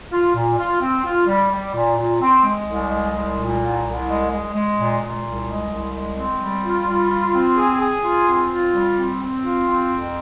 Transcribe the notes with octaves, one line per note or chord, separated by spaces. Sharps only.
F4
A#2
F4
C4
F4
G3
G3
A#2
A#2
C4
G#3
C2
G#3
C2
A#2
C2
C2
G#3
G#3
G#3
A#2
A#2
C2
G#3
C2
G#3
C4
G3
F4
G3
F4
C4
G#4
G#4
F4
C4
F4
G3
C4
C4
F4
C4
F2